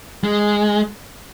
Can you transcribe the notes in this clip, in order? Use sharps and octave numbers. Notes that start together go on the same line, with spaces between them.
G#3